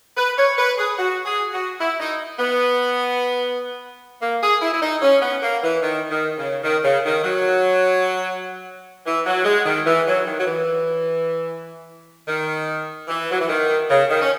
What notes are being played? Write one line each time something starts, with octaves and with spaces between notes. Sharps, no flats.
B4
C#5
B4
G#4
F#4
G#4
F#4
E4
D#4
B3
A#3
G#4
E4
E4
D#4
C#4
B3
A#3
E3
D#3
D#3
C#3
D#3
C#3
D#3
F#3
E3
F#3
G#3
D#3
E3
F#3
D#3
F#3
E3
D#3
E3
F#3
E3
D#3
C#3
D#3
C#4